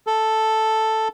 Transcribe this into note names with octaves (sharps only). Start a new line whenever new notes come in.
A4